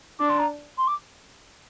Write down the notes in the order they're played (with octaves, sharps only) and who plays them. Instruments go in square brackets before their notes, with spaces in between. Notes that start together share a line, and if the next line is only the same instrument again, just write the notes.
[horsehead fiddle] D4 [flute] D6
[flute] C6
A#5
C6
D6